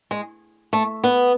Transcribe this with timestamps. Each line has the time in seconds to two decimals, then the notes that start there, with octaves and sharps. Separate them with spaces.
0.11 G#3
0.73 A3
1.04 B3